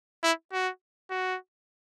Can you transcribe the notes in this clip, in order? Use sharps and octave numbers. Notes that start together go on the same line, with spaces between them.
E4
F#4
F#4